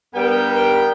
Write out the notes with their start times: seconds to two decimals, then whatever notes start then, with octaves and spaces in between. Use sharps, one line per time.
0.15 G2 G3 B3 A#4 G5